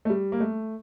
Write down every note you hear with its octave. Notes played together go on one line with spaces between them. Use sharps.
A3
G3
A#3
A3